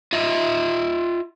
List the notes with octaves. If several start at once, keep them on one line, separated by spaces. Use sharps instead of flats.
F4 D#5 E5